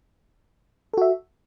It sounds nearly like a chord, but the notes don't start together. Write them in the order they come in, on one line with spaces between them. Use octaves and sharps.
A4 F#4 E5